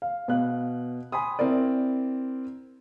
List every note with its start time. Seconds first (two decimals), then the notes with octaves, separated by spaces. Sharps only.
0.02 F5
0.28 B2 F5 F#6
1.12 G#5 B5 C6 D#6
1.39 C4 E4 A#4 D5